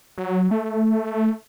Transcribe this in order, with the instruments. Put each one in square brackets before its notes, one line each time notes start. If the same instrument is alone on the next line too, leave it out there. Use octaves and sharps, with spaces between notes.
[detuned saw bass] F#3
A3